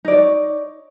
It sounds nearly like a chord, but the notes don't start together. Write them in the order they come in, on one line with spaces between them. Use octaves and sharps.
D#4 D5 C#5